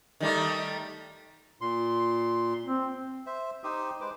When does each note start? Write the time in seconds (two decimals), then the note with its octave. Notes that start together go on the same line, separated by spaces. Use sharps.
0.20 D#3 G3 A3
1.61 A#2 C6
2.67 C4
3.26 C5 E5
3.64 D#4 G4 C5 D#6
4.01 G#3 B4 C5 D6